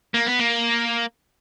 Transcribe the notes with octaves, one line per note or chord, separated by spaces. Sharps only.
A#3
B3
A#3